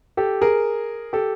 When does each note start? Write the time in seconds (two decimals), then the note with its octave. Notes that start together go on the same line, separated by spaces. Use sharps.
0.17 G4 A4
0.41 G#4 A#4
1.13 G4 A4